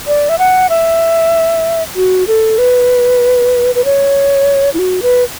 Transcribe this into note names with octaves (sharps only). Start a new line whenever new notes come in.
D5
E5
F#5
E5
F#4
A4
B4
B4
C#5
E4
F#4
B4